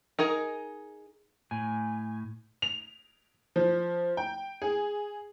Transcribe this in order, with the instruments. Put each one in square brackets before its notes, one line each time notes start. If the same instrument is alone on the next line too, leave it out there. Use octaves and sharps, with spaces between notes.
[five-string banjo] D#4 G#4 A#4
[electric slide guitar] A2 G#5
[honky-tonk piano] F7
F3
G5
G#4